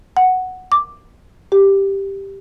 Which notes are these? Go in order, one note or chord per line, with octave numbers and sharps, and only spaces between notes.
F#5
D6
G4